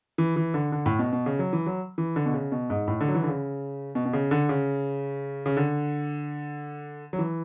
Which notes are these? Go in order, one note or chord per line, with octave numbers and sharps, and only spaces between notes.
E3
E3
D3
D3
A2
B2
B2
C#3
F#3
E3
F#3
E3
D3
B2
C#3
B2
G#2
A2
D3
F#3
E3
D3
C#3
B2
B2
C#3
D3
C#3
C#3
D3
F#3
E3